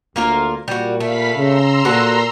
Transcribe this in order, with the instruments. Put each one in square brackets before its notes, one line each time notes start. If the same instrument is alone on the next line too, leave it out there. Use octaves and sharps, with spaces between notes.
[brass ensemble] D2 [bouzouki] A#3 F4 A#4
[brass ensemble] A#2 [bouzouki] G3 F#4
[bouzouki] A3 [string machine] F5 B5 B6
[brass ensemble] C#3 [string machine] A#5 C6 E6
[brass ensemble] A#2 [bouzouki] F#4 A4 B4